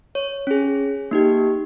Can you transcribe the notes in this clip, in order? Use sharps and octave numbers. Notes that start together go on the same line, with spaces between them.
C#5
C#4 G#4
A#3 D#4 G4